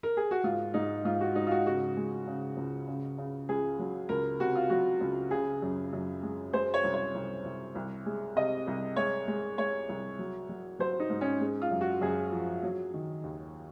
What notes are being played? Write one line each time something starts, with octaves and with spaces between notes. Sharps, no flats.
A#4
G#4
F#4
G#2 F4
G#2 D#4
G#2 F4
F#4
G#2 D#4
F4
F#4
C#3 F#4
G#3
C#3
C#2
C#3
C#3
C#2 G#4
F#3
C#2 A#4
C3 F#4
F4
F#3 F#4
C#2
C#3 G#4
F#2
F#2
G#3
G#3 C5
C#5
C2
C#5
C2
C2
C2
G#3
C3 D#5
C2
G#3 C#5
G#3
G#3 C#5
C2
F#3
F#3
F#3 C5
D#4
G#2
C#4
G#3
F4
F#2
F#4
F#2 G#4
F3
F#3
D#3
D#2